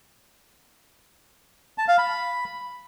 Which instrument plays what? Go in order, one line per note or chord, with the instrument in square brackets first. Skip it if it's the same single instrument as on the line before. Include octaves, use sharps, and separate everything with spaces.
[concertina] A5
F5
B5